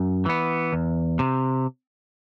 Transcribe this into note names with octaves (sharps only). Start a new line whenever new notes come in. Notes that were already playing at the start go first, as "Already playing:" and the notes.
Already playing: F#2
E3 B3
E2
C3